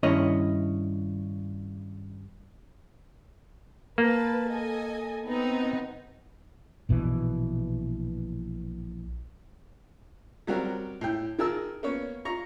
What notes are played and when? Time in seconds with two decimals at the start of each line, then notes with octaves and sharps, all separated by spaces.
0.03 G2 D#3 C#4 E4 C#5 D#5
3.98 A#3 B4 A5
4.47 A4 D#5 G#5
5.25 B3 C4 D#4
6.89 A#1 B2 D#3 E3
10.47 F#3 G3 C4 F#4 A#4
11.01 A2 G5
11.39 D#3 G#4 A#4 A5 E6
11.83 A#3 B3 C#4 C#5
12.25 F4 A#5 C#6